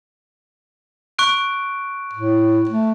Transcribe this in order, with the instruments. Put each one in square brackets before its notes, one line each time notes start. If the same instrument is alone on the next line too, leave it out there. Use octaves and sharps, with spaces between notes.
[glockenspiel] C#6 F#6 D7
[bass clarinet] A2
A3